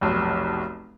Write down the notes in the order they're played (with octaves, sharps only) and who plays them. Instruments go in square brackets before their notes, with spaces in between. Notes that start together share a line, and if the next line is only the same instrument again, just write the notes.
[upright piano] F1 B1